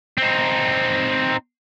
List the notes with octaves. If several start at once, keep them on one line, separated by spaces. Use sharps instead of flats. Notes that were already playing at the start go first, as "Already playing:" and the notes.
C4 D#4